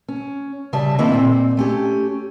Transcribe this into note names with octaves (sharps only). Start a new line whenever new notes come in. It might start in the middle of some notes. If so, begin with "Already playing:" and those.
C#4
C#3 G3 E5 A5
D#3 A#3 C4 E4
A#2 C4
A3 C#4 G4